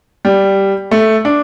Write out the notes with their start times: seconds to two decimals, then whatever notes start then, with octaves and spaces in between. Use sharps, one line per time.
0.25 G3
0.91 A3
1.25 D4